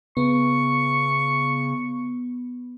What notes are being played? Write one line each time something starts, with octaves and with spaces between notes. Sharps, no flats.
C#3 B3 C#6